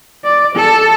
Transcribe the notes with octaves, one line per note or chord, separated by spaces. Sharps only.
D5
A4